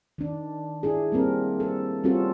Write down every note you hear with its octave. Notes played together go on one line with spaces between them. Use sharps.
D#3 D4
D4 E4 G#4
G3 A#3 C4 A#4
A4
G3 C4 C#4 F4 F#4 A4